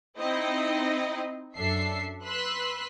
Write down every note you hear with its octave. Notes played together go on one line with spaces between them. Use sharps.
C4 D#4 E4 D#5
F#2 D4 A4 E5 C7
B4 C6 E6 F#6 B6